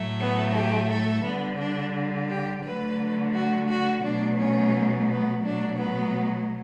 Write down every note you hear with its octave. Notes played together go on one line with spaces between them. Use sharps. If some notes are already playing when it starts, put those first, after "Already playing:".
Already playing: A2 F#3 A3
B3
G4
A4
D3 G3 B3
D4
G4
D3 F#3 A3 B4
F#4
F#4
B2 F#3 A3 D4
C#4
B3
B2 F#3 A3 D4
B3